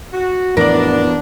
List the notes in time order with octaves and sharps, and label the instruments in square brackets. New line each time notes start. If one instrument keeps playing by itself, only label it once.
[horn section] F#4
[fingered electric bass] F2 A2 E3 [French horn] B3 [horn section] D4 [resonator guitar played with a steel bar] A#4 D5